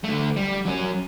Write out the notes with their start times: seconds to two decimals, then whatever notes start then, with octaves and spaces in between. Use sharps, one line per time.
0.04 D3 A3
0.36 G3
0.66 F#3 C#4